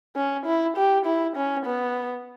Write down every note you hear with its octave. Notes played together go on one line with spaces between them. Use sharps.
C#4
E4
G4
E4
C#4
B3